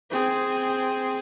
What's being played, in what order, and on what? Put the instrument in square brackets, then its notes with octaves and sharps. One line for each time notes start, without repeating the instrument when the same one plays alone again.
[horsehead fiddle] C4 G#4